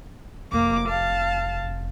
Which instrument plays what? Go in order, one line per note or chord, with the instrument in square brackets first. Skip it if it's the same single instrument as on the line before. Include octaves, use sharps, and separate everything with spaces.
[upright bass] F1 C3 [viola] A#3 D6
[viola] F5 A5